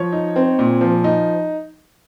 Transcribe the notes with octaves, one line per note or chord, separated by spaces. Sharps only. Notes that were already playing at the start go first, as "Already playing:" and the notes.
Already playing: F3 C#5
D#4
C4
A#2
F3
D#4